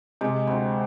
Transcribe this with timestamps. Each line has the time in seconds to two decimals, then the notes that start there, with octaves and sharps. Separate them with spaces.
0.21 C3 G#3
0.47 D2 C4